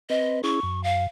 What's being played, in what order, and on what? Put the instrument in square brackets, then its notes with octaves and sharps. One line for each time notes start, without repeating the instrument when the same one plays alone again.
[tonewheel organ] C4 B4 [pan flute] D#5
[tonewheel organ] C#4 E4 G#4 [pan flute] C#6
[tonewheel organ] F#2
[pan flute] F5